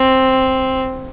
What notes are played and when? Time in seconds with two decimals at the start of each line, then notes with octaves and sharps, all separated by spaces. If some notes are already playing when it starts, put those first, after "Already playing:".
Already playing: C4